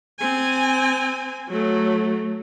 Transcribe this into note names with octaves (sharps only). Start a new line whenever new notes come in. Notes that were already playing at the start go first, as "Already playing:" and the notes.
C4 G#5
F#3 A3